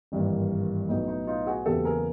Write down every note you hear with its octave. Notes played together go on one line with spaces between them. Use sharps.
G#1 G2 E3 G3 A#3
B1 A2 F#3 B3 D#4
D#4
D#4 F4
F#4 G#4
F#1 E2 C#3 F#3 B3 G4 A4
G#4 A#4